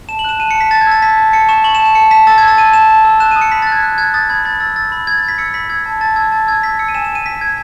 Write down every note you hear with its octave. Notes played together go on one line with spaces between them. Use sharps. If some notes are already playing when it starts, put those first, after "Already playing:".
A5 E7
F#7
F#6 E7
A5 D#7
C#7
A5
B6
A5 A6
G#6
E6 A6
A5 B6
A5
A5 C#7
C#6 E7
C#6 F#7
E7
A5
E7
A5 C#7
A5 B6
E6 A6
G#6
E6 A6
A5 D#7
A5 E7
A5
E6
F#6 E7
D#7
D#6
C#7
B5 B6
A6
F#6
G#6
F#6
F#6 G#6
D#6 A6
B5 G#6
B5 A6
E6 A6
E6 A6
B5
B5 G#6
A6
B5
B6
E6 C#7
B5 B6
E6 G#6
A5
A5 A6
E6 G#6
A5 A6
E6 G#6
E6 B6
E6 C#7
D#7
G#5 E7
E7
G#5
D#7
G#5 B6
G#5 G#6